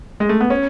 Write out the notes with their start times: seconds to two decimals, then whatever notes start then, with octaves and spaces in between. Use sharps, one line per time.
0.20 G#3
0.29 A3
0.41 B3
0.50 C#4